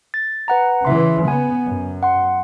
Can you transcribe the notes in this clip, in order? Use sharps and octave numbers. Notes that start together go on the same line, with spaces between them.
A6
B4 F#5 A#5
C#3 E3 E5 C6
B3 G#5
F#2
F#5 C6